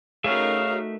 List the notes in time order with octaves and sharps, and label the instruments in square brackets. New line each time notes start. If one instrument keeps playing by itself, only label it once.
[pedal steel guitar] A3 E5 [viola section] D#4 F#4 A#4 [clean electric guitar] G#4 C#5 [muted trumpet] F5